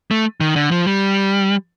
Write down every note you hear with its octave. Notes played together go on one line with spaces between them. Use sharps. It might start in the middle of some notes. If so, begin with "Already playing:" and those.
A3
D#3
D3
F3
G3